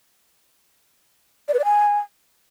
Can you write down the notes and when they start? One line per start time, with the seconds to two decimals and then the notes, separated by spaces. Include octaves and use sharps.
1.48 D5
1.54 B4
1.59 D5
1.64 G#5